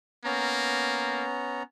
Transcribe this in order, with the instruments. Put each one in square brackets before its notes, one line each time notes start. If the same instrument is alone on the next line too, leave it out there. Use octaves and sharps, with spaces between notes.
[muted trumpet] A#3 [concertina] B3 C#4 A#5